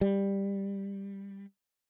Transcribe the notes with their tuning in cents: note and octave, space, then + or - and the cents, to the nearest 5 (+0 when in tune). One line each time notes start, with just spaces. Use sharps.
G3 +10